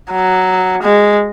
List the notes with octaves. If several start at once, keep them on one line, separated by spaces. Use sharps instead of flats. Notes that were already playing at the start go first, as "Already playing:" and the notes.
F#3
G#3